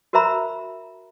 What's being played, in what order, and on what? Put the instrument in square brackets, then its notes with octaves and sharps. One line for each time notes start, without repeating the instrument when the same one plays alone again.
[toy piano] F#4 A#4 C5 E5 A#5 B5